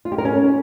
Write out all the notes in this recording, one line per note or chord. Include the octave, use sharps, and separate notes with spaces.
F4
G4
A#4
C#4